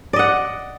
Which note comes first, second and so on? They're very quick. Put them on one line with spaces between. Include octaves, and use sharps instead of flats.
D5 D#5 F#5